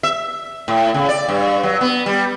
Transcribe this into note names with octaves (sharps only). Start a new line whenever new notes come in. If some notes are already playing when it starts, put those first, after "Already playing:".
E5
A2
C#3
D5
G2
F#3
B3
G3